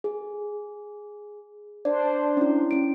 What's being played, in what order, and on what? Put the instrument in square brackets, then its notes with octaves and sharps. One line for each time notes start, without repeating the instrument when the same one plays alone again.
[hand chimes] G#4
[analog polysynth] D4 C5 [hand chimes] D5
[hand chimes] C#4 E4
C#4 D7